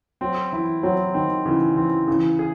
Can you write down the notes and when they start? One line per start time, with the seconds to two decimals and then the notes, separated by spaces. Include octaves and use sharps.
0.21 F#3 C4
0.52 E3 E4
0.83 F#3 C4
1.14 D#3 C4
1.46 C#3 E3
1.76 E3 C4
2.07 C#3 E3
2.39 G#4